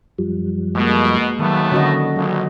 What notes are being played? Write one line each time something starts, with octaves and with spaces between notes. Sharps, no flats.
F#2 F3 G3
B2 G#3 A#3
D#2 D#3 F#3 A3 B3
D3 C#4 F#4 D#5
A#1 F#3